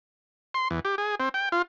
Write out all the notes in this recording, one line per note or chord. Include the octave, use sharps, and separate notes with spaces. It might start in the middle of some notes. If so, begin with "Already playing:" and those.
C6
E2
G4
G#4
C4
G5
F4